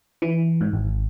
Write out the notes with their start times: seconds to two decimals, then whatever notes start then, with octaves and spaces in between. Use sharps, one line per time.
0.22 E3
0.61 G#2
0.73 G#1